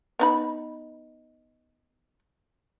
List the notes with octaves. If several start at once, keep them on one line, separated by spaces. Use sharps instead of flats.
B3 D#4 B5